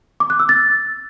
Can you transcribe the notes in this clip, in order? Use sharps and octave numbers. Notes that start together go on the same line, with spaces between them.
D6
F#6
E6
A6